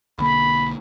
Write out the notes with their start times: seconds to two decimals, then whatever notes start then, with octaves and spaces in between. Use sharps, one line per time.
0.19 B1 D3 A#3 B5